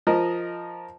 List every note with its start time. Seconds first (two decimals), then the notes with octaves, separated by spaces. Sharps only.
0.07 F3 A#4 D#5